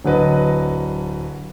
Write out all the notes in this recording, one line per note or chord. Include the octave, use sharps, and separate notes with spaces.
D1 D3 F#3 B4 D#5